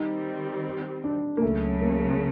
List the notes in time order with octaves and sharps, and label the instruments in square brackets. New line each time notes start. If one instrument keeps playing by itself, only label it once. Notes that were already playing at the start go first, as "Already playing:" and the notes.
Already playing: [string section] D#3 G3 C4 [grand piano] D#4
[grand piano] D4
A#3
[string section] C#2 C#3 F#3 [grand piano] A3
[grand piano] A#3